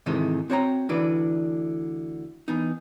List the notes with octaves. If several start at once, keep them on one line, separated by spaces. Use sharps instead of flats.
G#2 C3 D#3 E3 G#3 A3
C4 F#4 C#5 G5 G#5 A#5
D2 D3 E3 D4 B4 D5
E3 B3 D#4